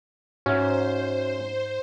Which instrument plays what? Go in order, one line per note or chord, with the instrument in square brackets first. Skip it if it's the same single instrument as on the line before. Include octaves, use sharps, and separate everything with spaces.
[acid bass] G#2 [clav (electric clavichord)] C#4 [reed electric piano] F#4 E5 [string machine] C5